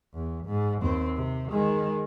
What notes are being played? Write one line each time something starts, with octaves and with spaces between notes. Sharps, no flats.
E2
G#2
D#2 C4
C3
D#3 G#3